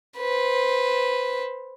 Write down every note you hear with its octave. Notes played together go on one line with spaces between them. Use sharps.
B4 C5